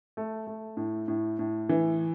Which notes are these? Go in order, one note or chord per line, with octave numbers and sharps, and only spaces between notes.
A3
A3
A2
A2
A2
E3